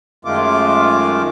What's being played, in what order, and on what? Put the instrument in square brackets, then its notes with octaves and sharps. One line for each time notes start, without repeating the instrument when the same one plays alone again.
[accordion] F#2 D#3 G#3 A3 F4 D6